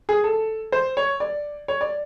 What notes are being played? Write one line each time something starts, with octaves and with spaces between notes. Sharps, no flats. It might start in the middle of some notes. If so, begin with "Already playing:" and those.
G#4
A4
C5
C#5
D5
C#5
D5